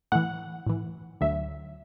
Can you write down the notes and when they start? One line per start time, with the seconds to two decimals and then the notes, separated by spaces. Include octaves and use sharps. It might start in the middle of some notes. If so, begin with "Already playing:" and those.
0.12 A2 E3 F#5
0.67 A2 E3
1.21 D2 D3 F#3 E5